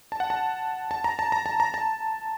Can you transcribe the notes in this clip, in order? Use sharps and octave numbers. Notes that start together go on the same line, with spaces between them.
A5
F#5
A5
A5
A#5
A5
A#5
A5
A#5
A5